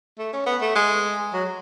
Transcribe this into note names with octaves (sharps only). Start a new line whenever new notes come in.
A3
C#4
B3
A3
G#3
F#3